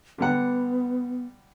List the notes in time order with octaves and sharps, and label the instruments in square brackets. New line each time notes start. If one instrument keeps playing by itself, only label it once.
[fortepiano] D3 G3 F#5 [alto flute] B3